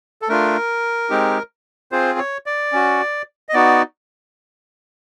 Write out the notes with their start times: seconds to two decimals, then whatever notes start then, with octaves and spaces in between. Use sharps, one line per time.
0.22 A4
0.28 A3 D4 F4 A#4
1.10 G#3 C4 D#4 G4
1.92 C4 F4 G#4 C5
2.19 C#5
2.46 D5
2.72 C#4 F#4
3.49 D#5
3.54 B3 D#4 F#4 D5